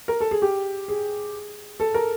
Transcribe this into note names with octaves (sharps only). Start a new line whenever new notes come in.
A#4
A4
G#4
G4
G#4
A4
A#4